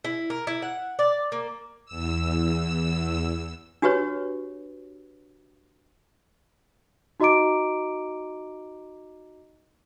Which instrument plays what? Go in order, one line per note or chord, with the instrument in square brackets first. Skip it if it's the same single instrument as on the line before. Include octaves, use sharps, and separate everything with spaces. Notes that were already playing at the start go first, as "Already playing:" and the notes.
[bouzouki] E4
A#4
E4
F#5
D5
A#3
[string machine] E2 E6
[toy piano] D4 F#4 G4 B4 C#5
[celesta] D#4 F#4 D#5 A#5 D6 D7